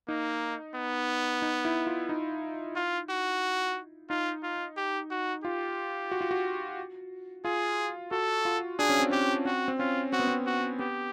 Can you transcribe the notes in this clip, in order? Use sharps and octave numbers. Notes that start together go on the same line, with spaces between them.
A#3 D#4
B3
D#4
E4
F4
D#4
F4
F#4
D#4 F4
F4
G4
F#4
F4 G4
F#4
F4
F#4
F4 G#4
F#4 A4
F4
D4 G#4
C#4
C4
C#4 G4
C4 F#4
C4
C#4 F4
C4 F#4
B3
C4
F#4
B3 G4